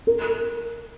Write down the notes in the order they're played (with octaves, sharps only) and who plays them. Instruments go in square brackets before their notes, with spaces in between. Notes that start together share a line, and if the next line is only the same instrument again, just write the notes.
[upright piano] A#4